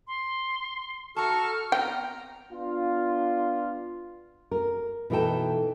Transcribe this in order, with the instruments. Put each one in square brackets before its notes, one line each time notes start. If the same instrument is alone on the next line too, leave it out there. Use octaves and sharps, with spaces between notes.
[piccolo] C6
[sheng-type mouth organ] F#4 A4 C#6 [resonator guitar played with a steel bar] A5 A#5 [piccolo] F6
[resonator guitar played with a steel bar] B3 C4 [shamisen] G5 [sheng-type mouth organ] A#5
[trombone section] B3 D4 F4
[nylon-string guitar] A#4
B2 E3 D#4 A4 G5 A5